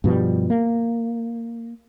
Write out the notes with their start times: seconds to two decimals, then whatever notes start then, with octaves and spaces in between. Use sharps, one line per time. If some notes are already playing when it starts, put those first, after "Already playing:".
0.04 G2 B2 F3 G3
0.50 A#3